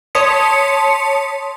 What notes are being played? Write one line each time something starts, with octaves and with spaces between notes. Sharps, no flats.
C#5 A5 C6 D#6 B6 C#7